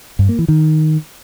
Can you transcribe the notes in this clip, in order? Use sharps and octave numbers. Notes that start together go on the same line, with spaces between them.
G2
A#3
E3
D#3